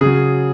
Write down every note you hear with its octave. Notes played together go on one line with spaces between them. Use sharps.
C#3 F#3 G#4